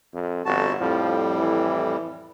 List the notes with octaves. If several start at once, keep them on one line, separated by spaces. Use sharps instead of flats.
F2
G1 F2 F#4 A5
F2 A2 F3 G3
E3